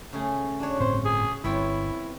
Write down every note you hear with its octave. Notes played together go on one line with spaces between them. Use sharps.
C#3 A3 G#4
D4 F#4 C#5
G1 A2 C4 C5
G#4
G1 B3 C4 E4 C#5